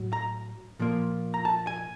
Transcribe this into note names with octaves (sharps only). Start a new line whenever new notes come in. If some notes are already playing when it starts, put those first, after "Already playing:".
Already playing: A2 F#3
A#5
A#2 F3 A#3
A#5
A5
G#5